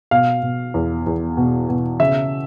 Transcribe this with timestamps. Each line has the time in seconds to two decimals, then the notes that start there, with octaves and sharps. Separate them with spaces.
0.11 B2 F5
0.43 B2
0.74 E2
1.06 E2
1.37 B2
1.69 B2
2.00 C#3 E5